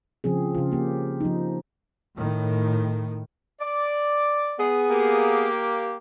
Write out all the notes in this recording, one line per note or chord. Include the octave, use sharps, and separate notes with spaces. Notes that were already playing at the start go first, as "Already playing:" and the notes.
C#3 F3 C4 G#4
C#3 F4
A#3 G4
F3 D#4
A2 D#3
D5
B3 G#4
A#3 G4